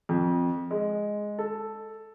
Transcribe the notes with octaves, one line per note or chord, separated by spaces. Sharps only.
F2
G#3
A4